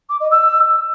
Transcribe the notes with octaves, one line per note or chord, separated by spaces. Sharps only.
D6
D#5
E6